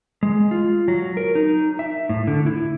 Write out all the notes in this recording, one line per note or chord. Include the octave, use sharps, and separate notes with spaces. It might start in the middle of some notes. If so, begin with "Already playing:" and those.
G#3
F4
F#3
A#4
D#4
E5
A2
D3
E4